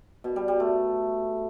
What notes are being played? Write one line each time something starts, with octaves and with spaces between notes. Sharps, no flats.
B2
G3
G3
A3